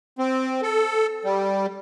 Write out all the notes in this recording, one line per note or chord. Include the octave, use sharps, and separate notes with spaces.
C4
A4
G3